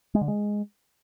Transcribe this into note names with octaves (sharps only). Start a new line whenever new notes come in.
G#3
D3
G#3